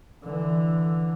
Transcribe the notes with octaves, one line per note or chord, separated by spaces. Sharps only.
D3 E3